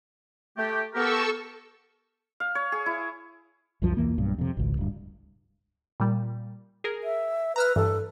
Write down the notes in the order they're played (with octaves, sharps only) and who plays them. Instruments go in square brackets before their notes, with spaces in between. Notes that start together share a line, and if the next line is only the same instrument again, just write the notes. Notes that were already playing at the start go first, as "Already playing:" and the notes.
[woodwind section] A3 G4
[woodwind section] B3 G4 A#4 [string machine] A4 C#6 E6
[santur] F5
C#5
G#4
E4
[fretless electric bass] C2 F#2 F3
B1 E2 E3 A#3
B1 G2
F2 C3
G#1 C#2
D1 G2
[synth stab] A#2 G3
G#4 A#4
[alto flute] E5
[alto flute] B4 [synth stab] A#5 E6 F6
[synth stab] G2 E3 [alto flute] A4